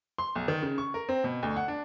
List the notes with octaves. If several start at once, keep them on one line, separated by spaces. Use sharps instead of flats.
C6
B1
D#3
C#3
C#6
A#4
C4
B2
D2
F#5
D4